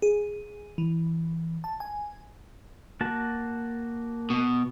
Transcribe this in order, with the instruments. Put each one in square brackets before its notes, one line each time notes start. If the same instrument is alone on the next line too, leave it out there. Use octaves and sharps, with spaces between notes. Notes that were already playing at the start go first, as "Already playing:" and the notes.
[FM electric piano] G#4
E3
A5
G#5
[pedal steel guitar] A#3 F#4 A5
[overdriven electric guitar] B2